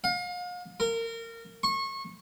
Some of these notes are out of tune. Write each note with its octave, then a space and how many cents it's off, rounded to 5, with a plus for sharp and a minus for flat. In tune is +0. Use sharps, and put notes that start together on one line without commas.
F5 +40
A#4 -25
C#6 -30